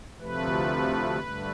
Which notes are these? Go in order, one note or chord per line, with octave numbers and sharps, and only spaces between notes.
D2 C3 F3 A3 B4
G2 D3 A3